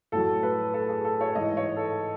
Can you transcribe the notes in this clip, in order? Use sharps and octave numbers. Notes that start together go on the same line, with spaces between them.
A2 F#3 A4
B4
A4
G#4
A4
C#5
G#2 E3 D#5
C#5
A4